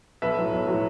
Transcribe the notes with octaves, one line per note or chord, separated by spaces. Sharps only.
B1 B4 E5
A2 F#3
B1
A2 F#3